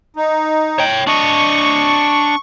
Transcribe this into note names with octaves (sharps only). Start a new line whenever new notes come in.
D#4
C#5 G5
D4 D#5 C#6